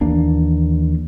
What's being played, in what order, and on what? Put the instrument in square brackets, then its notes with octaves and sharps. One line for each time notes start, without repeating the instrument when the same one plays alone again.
[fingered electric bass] D#2 E3 A#3 D4